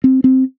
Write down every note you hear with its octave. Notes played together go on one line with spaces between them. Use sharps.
C4
C4